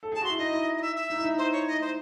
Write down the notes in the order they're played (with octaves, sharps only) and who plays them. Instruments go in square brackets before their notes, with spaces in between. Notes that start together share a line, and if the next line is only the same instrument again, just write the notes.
[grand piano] A4
[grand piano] G#4 [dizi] A5
[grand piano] F#4 [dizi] C6
[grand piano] E4
[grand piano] D#4 [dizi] D#5
[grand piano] E4
[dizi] D#5
E5
E5
[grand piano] D#4
E4
D#4
[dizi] C5
C#5
D#5
C5